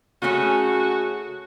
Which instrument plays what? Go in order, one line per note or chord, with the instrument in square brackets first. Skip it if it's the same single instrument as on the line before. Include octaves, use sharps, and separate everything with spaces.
[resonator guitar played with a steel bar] C#3 A3 C#4 [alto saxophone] F#4